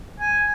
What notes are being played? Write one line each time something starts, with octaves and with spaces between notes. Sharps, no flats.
G#5